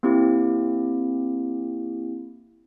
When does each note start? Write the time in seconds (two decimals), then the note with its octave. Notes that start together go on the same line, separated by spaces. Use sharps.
0.03 A#3 C4 E4 G4